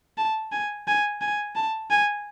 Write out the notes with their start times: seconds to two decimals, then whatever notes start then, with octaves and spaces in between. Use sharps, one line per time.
0.17 A5
0.52 G#5
0.87 G#5
1.21 G#5
1.56 A5
1.90 G#5